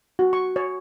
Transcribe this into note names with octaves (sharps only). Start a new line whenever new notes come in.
F#4
C#6
C#5